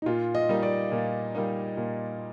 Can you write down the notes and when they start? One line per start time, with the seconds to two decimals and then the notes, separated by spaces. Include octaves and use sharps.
0.02 D#4
0.06 A#2 F4
0.35 D#5
0.49 G3 A#3 D#4
0.63 D5
0.92 A#2
1.35 G3 A#3 D#4
1.77 A#2